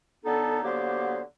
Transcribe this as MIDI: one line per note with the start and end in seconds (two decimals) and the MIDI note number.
0.24 0.63 42
0.24 0.63 50
0.24 0.63 59
0.24 0.63 63
0.24 0.63 69
0.64 1.20 50
0.64 1.20 54
0.64 1.20 58
0.64 1.20 59
0.64 1.20 67
0.64 1.20 72